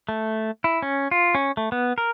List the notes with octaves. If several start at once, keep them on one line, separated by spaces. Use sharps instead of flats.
A3
E4
C#4
F4
C#4
A3
B3
A#4